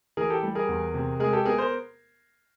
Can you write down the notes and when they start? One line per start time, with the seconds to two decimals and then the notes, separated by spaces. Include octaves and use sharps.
0.17 E3 G#4 A#4
0.30 G4 A4
0.43 G3
0.55 G#4 A#4
0.68 E2
0.94 C3
1.20 G#3 G#4 A#4
1.33 G4 A4
1.45 B3 G#4 A#4
1.58 A#4 C5